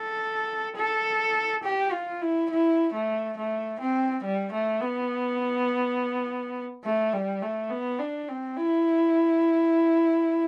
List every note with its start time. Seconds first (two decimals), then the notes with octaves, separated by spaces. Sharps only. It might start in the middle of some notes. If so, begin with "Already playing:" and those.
Already playing: A4
0.76 A4
1.63 G4
1.92 F4
2.21 E4
2.50 E4
2.93 A3
3.37 A3
3.80 C4
4.24 G3
4.52 A3
4.81 B3
6.84 A3
7.13 G3
7.42 A3
7.70 B3
7.99 D4
8.29 C4
8.57 E4